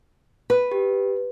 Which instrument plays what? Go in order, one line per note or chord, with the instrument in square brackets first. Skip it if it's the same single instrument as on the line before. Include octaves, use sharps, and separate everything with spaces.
[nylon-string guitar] B4
[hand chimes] G4